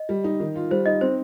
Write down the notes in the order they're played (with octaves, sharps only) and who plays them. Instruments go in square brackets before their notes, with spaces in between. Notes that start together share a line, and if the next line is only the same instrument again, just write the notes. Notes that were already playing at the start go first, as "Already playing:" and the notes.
Already playing: [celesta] D#5
[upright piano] G3
D#4
D#3
F4
[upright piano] G3 [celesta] C5
[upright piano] D#4 [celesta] D#5
[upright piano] C4 [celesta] C5